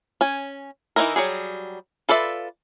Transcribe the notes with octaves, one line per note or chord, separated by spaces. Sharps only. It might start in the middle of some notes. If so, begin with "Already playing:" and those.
C#4 G#5
E3 F#3 D#4 E4 A#4
F#3 G3 G#4
F4 A4 B4 D5 E5